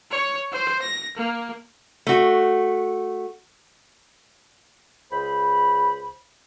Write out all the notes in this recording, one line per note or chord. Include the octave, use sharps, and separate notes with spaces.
C#5
C5
A#6
A#3
A3 F#4
C#2 C5 B5